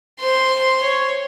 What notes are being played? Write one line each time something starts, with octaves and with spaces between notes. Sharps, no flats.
C5 C6
C#5